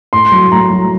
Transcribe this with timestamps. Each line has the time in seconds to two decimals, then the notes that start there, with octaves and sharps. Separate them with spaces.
0.13 A2 C6
0.32 F#3
0.52 A2 A#5
0.70 F#3